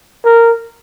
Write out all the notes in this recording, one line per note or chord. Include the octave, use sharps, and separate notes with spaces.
A#4